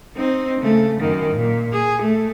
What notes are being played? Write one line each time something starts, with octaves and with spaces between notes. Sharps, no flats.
C4 D#4
C#3 A3
F#2 D#3
A#2
G#4
A3